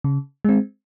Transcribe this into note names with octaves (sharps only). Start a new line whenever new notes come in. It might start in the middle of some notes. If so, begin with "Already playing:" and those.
C#3
G#3 C4